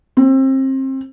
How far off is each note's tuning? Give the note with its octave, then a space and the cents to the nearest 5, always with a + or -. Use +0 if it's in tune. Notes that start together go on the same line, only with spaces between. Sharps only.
C4 +30